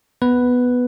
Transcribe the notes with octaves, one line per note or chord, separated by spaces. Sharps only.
B3 B4